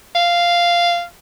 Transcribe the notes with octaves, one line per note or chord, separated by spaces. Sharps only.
F5